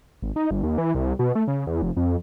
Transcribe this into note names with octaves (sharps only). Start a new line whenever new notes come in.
G#1
D#4
G1
D#2
E3
C2
B2
A3
C#3
E2
F1
F2